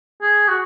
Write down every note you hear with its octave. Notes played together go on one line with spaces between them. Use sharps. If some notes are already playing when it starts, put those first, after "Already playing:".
G#4
F#4